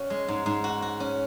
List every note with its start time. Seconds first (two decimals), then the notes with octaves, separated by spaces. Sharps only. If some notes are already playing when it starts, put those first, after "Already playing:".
Already playing: C#4 F#4
0.10 G#3
0.28 G#2
0.46 G#2
0.64 F#4
0.82 F#4
1.00 C#4